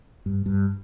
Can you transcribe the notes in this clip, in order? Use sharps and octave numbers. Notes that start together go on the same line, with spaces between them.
G2
G2